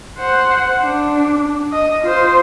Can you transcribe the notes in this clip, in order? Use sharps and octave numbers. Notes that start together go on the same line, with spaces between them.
C5 F#5
D4
D#5
F4 C5